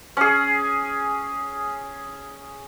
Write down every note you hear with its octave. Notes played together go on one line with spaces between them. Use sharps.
C#4 G#4